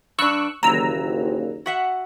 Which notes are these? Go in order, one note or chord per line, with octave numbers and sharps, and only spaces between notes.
G2 D4 C#6 E6 F#6
F#1 D#2 A#2 E3 A#5 E6
F#4 E5 F#5